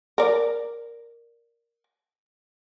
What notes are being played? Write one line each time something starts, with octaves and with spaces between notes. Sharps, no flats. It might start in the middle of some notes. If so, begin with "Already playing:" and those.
A#4 D5